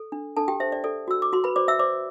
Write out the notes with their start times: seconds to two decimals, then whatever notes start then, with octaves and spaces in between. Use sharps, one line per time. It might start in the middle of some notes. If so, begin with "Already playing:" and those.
Already playing: A4
0.12 D4
0.37 D4 A4 A5
0.48 G4 G5
0.60 C5 E5
0.72 D5
0.84 A4 D5
1.08 F#4 E6
1.22 D6
1.33 F#4 C6
1.44 B4 B5
1.56 C5 D5 D6
1.68 E5 E6
1.79 C5 D5 D6